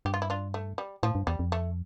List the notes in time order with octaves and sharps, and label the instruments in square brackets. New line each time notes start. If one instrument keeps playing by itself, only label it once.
[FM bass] G2 [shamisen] G4
[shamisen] F4
E4
D4 F4
A3
G3
[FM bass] A2 [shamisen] F3
[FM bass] G2
[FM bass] E2 [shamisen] G3
[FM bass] F2
[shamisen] A3